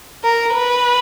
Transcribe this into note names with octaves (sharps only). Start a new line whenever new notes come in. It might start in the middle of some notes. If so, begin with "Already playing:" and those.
A#4
B4